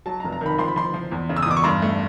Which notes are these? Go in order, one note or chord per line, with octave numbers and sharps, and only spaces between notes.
F#3 A5
A#5
F1
A#5
D#3 B5
F3 C6
B5
F3 C6
F3
E2
C#3
E6
D#6
E2 D6
C#6
G2 C6
A3